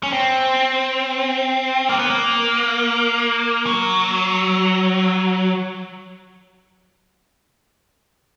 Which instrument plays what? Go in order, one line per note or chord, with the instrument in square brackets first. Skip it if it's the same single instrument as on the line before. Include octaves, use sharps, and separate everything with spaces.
[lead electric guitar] C#4
C4
A#3
B3
A#3
F#3